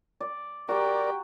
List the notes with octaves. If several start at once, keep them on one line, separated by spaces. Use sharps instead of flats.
D5
F#4 G4 A#4 D5 A#5